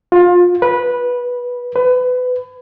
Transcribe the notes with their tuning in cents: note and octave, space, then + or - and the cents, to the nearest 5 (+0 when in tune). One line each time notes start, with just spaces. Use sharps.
F4 +25
B4 -15
B4 +25